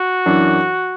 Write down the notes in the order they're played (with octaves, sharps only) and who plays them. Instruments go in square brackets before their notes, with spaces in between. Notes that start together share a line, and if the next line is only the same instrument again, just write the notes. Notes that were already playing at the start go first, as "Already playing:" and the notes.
Already playing: [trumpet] F#4
[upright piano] F#2 E3 D4